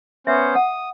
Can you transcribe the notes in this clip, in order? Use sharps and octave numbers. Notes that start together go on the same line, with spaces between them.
B3 C#4 C5 E5
F#5 D#6